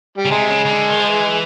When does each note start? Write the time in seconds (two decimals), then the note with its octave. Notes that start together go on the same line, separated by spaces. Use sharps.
0.17 G3
0.26 C#3
0.31 C3 G#3
0.50 C#3
0.65 C#3
0.69 D3
0.89 D#3
1.00 F3
1.08 E3